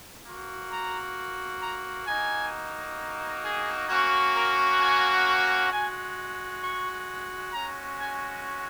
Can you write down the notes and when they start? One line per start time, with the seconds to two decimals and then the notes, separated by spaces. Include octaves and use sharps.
0.25 A#3 F#4
0.70 A#5
1.62 A#5
2.07 A#3 D#4 F#4 G#5
3.43 G#4
3.89 A#3 C#4 F#4
4.34 A#4
4.80 G#5
5.70 G#3 F#4 G#5
6.62 C#6
7.53 G#3 C#4 F#4 A#5
7.99 G#5